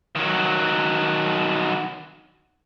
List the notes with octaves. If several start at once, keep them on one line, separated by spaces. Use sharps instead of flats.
D#3 F#3